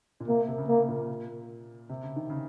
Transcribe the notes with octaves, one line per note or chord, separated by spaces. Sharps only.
A#2
C3 A#3
C3
C#3
A#3
A#2
C3
C#3
D#3
C#3